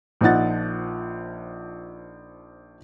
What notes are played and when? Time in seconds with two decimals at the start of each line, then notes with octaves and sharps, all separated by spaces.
0.21 A#1 F3 D#4 F#5 A6